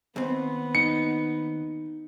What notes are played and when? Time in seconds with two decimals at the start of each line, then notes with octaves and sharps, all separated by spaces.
0.16 D#2 B3 C4
0.75 D#4 C#7